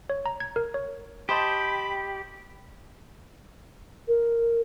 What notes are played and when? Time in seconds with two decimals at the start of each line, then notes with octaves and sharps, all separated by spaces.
0.10 C#5
0.26 A#5
0.40 G#6
0.56 A#4
0.74 C#5
1.29 G4 C5 D#5 A5 B5
4.08 A#4